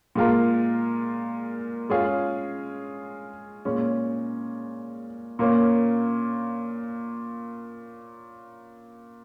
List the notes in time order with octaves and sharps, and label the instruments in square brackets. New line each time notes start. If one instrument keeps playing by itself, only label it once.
[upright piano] A#2 G#3 F4 A#4
G#3 C#4 F4 G#4
A#2 G#3 C#4
A#2 A#3 C#4